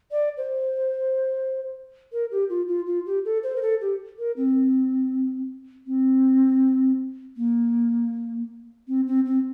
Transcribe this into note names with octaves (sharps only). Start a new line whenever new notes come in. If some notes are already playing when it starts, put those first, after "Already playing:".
D5
C5
A#4
G4
F4
F4
F4
G4
A4
C5
A#4
A4
G4
A#4
C4
C4
A#3
C4
C4
C4